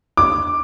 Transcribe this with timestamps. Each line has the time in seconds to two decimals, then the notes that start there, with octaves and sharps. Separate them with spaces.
0.17 D6